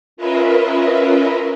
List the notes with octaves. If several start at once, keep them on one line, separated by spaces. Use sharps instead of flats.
C#4 F4 A#4 B4 D#5 E5